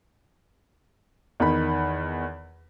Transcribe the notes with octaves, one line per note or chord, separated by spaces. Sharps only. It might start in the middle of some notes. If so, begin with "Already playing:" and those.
E2 D#3 B5